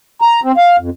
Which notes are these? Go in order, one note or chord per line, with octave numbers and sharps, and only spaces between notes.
A#5
C4
F5
F2